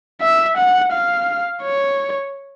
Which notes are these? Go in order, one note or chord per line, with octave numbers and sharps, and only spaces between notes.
E5
F#5
F5
C#5